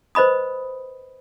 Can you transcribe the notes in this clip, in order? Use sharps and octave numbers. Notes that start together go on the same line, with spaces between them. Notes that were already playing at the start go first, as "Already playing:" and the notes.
B4 C5 D#5 B5 D#6